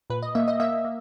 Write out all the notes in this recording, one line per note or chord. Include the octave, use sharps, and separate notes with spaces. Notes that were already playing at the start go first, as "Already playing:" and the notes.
A#2 B4
D#5
A#3 E5
D#5
A#3 E5
A#3